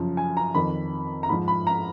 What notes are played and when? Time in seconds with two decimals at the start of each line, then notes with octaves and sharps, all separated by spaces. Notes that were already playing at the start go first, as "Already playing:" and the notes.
Already playing: F#2 C#3 F3
0.17 G#5
0.37 A#5
0.55 F2 D#3 B5
1.23 A#5
1.29 G#2 F3 B5
1.48 B5
1.67 A#5